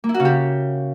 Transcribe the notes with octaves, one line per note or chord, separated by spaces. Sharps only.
A#3
E4
F#4
C#3
G4